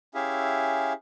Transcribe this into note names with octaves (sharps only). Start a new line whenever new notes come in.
C#4 E4 G4 G#4 E5 F5